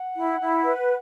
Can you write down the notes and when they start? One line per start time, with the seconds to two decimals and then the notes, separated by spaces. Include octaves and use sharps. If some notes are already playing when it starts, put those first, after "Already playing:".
Already playing: F#5
0.16 E4
0.40 E4
0.64 B4